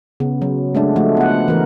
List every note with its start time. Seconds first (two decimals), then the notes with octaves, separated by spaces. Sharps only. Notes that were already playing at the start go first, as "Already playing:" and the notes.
0.20 C#3 B3
0.42 F#3
0.75 G#3 A3 D4
0.96 F3 G#3 A3 F#4
1.17 B3 F#5
1.48 E3 A3 A#4